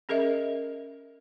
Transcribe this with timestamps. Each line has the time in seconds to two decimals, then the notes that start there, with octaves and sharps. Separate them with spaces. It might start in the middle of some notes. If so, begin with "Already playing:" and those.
0.09 C#4 G#4 A#4 D#5 E5